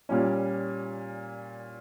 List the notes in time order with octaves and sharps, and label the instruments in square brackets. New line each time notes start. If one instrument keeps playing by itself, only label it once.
[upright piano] A#2 G3 C#4